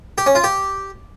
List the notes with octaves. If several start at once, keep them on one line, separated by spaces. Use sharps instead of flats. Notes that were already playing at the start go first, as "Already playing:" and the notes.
G4
C#4
F4
G4